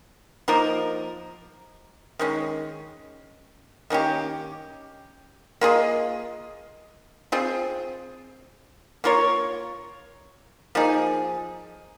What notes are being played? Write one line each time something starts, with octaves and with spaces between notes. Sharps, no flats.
F3 A#3 D#4 A#4
D#3 G#3 C#4
D#3 A#3 C#4 G4
A#3 F4 G#4 D#5
C4 F4 G#4
A#3 F4 A#4 C#5
F3 A#3 D#4 G#4